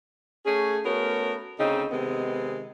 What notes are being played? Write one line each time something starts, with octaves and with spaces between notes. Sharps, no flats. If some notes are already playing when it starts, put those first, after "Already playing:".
A3 C#4 G#4
A3 B3 C#4 F#4 A#4
D2 C#3 C4 D#4
C3 D#3 G#3 B3 C4